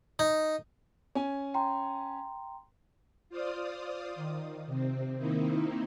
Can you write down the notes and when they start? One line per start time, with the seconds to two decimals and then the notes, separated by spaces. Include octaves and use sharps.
0.19 D#4
1.15 C#4 G#5
1.54 G5 A#5 C6
3.29 F4 C5 D5 F5 D#6
4.15 D#3
4.66 C3 C4
5.18 D#3 A#3 C4 D#4 E4